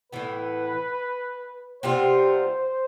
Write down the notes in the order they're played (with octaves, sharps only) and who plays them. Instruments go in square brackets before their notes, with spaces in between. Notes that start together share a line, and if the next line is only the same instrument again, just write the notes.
[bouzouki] A2 E3 B3 [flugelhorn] B4
[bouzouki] C3 G3 B3 F4 [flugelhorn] C5